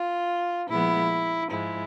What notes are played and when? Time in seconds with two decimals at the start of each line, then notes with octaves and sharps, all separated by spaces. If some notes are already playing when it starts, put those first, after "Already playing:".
Already playing: F4
0.69 A#2 F3 G#3 B3 E4
1.50 G#2 F3 G#3 E4